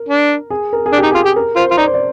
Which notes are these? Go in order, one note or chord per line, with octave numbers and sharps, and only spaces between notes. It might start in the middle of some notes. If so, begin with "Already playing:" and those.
Already playing: A#4
D4
G#4
A#4
G#4
D4
G4
D#4
F4 G#4
G4
A#4
F4 C5
F4
D#4 D5
C5
D5